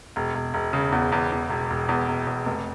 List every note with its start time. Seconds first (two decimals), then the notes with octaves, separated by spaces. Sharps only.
0.16 E1
0.35 E1
0.54 E1
0.73 C#3
0.92 E2
1.12 E2
1.32 E2
1.50 E1
1.70 E1
1.89 E2
2.08 E1
2.27 E2
2.46 F1